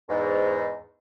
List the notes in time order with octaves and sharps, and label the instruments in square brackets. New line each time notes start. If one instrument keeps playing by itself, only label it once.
[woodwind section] E2 G#2